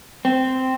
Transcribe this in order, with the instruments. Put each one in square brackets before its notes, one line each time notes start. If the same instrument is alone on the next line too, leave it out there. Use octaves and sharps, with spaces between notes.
[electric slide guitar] C4